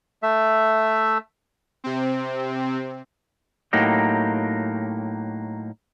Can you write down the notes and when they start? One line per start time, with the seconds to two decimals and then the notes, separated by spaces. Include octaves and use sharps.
0.23 A3 E5
1.84 C3 C4
3.73 A2 F#3 A#3 D#4 G4